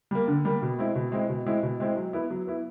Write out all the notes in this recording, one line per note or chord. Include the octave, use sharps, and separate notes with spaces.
G3 A#3
D3
G3 A#3
B2
G#3 C4 E4
B2
G#3 C4 E4
B2
G#3 C4 E4
B2
G#3 C4 E4
F#3
B3 E4
F#3
B3 E4